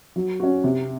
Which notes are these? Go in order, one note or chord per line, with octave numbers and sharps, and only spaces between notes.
F#3
C#4 F#4
C3